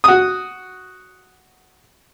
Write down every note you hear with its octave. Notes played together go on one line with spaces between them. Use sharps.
F#4 D#6